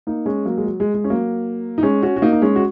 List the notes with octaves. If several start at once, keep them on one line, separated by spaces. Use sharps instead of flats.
A#3 D#4
G#3 C#4
F#3 A#3
G#3
F#3
G#3
G#3
C#4
F#3 A#3
D#4
G#3 C#4
C#4 F#4
F#4
A#3 D#4
D#4
G#3 C#4
F#4